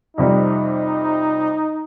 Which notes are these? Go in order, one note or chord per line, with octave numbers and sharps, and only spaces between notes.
F2 C3 G3 D#4